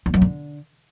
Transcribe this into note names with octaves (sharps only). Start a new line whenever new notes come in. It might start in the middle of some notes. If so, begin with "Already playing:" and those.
E2
F#2
D3